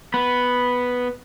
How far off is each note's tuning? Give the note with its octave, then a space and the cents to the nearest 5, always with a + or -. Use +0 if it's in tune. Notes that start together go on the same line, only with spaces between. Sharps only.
B3 +0 B5 +0